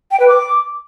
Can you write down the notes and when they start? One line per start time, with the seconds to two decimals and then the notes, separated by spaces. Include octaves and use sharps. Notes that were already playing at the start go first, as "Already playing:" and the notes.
0.11 G5
0.20 B4
0.28 D6